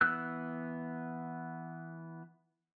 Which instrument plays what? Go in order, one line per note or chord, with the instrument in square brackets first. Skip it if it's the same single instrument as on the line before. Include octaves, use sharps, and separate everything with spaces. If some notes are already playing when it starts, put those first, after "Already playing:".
[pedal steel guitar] E3 B3 E6 F#6